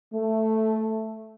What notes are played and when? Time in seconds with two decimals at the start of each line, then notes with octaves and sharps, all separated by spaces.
0.14 A3